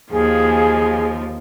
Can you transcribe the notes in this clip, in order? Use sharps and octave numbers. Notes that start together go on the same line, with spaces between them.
D#2 F3 G#4